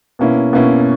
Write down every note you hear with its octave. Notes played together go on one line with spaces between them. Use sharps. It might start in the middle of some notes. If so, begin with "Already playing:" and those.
B2 A#3 C#4 E4
B2 A#3 C#4 E4